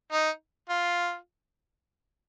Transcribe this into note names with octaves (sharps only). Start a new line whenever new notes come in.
D#4
F4